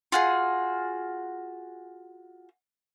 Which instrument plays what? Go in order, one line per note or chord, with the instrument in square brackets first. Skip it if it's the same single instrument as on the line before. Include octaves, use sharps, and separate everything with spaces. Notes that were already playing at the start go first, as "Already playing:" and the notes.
[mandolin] F4 F#4 G#4